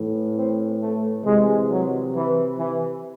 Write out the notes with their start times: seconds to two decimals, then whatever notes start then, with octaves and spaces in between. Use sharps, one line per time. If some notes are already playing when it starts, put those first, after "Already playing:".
Already playing: A2 E3
0.36 C4
0.80 A3
1.24 C3 E3 G#3
1.68 F#3
2.13 E3
2.58 E3